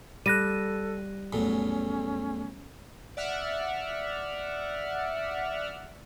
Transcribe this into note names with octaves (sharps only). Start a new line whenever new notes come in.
G3 A4 F#6 A#6 D#7
E2 A2 F#3 C#4
D5 E5 F#5 F6